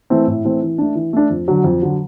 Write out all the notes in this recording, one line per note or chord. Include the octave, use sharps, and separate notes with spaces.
E3 A3 C4
A2
E3 A3 C4
E3
A3 D4
E3
A3 D4
F2
D3 F#3
F2
D3 F#3